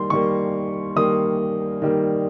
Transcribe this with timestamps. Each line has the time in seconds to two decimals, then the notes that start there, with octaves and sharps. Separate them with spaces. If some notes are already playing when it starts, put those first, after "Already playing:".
Already playing: D#3 G3 A#3 C6
0.10 D#3 G3 A#3 C#6
0.96 D#3 G3 A#3 D#6
1.82 D#3 G3 A#3